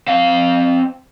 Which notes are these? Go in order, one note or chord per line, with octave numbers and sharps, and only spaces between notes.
C4 F5